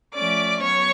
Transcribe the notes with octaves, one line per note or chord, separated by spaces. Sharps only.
F3 A3 C#4 D5 D6
F#3 B3 C#5 C#6